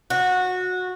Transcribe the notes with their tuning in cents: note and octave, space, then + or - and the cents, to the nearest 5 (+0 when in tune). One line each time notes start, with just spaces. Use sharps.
F#4 -15